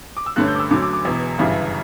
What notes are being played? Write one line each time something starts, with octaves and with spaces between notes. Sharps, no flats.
D6
E6
G2 D3 A3 C#4 F#6
G6
D6
E6
D2 D3 F#3 C#4 D6
D6
D6
E1 E2 B2
G1 F#2 C#3 E3 G3